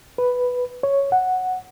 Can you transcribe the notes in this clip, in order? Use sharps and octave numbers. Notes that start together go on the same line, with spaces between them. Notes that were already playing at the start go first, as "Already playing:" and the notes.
B4
C#5
F#5